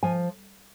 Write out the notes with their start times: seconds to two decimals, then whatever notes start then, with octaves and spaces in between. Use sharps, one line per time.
0.03 F3 G#5